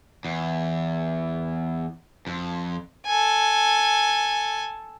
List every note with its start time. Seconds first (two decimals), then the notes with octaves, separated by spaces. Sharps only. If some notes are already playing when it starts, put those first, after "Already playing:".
0.25 E2
2.27 F2
3.06 A4 G#5